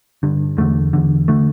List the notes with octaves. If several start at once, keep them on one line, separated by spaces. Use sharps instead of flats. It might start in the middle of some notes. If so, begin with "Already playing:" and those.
G2 D3
E2 D3 A3
E2 D3
D3 A3